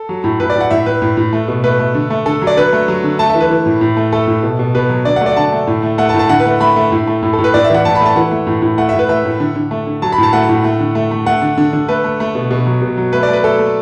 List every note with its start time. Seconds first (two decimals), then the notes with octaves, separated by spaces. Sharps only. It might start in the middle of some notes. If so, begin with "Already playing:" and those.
Already playing: A4
0.09 F#3
0.24 A2
0.40 A2 B4
0.50 D5
0.55 A2
0.60 F#5
0.71 A2 E5
0.86 A2 B4
1.02 A2
1.17 A2
1.33 A3
1.48 B2
1.64 A3 B4
1.79 A3
1.95 D3
2.10 A3
2.26 D3 A4
2.42 F#3
2.47 D5
2.57 D3 B4
2.73 A3
2.88 F#3
3.04 D3
3.19 A3 A5
3.30 E5
3.35 E3
3.40 B4
3.50 E3
3.66 A2
3.81 A2
3.97 A3
4.12 A3 A4
4.27 A2
4.43 B2
4.59 B2
4.75 B2 B4
4.90 F#3
5.05 D3 D5
5.16 F#5
5.21 A3
5.26 D5
5.33 F#5
5.36 D3 A5
5.53 A3
5.67 A2
5.83 A3
5.98 A3 F#5
6.09 A5
6.14 A2
6.19 A5
6.29 D3 F#5
6.40 B4
6.45 A3
6.60 A3 B5
6.76 A3
6.92 A2
7.07 A3
7.23 A2
7.33 A4
7.38 A2
7.44 B4
7.54 A2 D5
7.64 E5
7.70 E3 F#5
7.85 A2 A5
7.95 B5
8.00 A3
8.06 A5
8.16 E3 F#5
8.31 A3
8.47 A2
8.62 A2
8.78 A3 F#5
8.89 E5
8.93 A2
8.99 B4
9.09 A3 E5
9.25 A2
9.40 D3
9.56 D3
9.71 A3
9.86 D3
10.02 F#3 A5
10.12 B5
10.18 A2 A5
10.33 A3 F#5
10.49 A2
10.64 A3
10.80 D3
10.95 A3
11.11 A3
11.26 A3 F#5
11.42 D3
11.58 D3
11.73 D3
11.88 A3 B4
12.04 A3
12.20 A3
12.35 B2
12.51 B2
12.66 F#3
12.82 B2
12.97 F#3
13.13 A3 B4
13.23 D5
13.28 A3 B4
13.44 A3 A4
13.59 A3